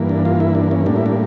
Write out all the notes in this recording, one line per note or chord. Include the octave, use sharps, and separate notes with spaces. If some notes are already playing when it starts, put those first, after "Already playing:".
Already playing: G2 E3 A#3
D4
F4
E4
D4
C#4
A2 G3 A#3 D4
E4
D4